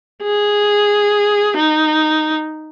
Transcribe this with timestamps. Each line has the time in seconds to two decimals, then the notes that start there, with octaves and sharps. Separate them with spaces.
0.23 G#4
1.57 D#4